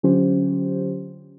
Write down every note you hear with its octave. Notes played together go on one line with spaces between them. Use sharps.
D3 F#3 C#4 F4 G4 C5